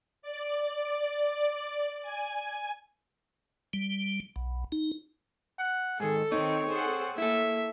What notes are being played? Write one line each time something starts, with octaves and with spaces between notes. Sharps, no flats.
D5
G#5
G3
B1
D#4
F#5
G#2 D#3 G#4 A4
D#3 C4 D#4 C#5
C4 G#4 A4 C5 F#5
A#3 E4 A4 E5